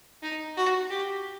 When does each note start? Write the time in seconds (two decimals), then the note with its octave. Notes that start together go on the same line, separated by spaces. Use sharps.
0.22 D#4
0.57 F#4
0.90 G4